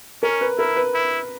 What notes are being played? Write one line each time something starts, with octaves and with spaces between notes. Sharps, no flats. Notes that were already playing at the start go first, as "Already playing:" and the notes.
C#4 A#4
B4
E4 A#4
B4
E4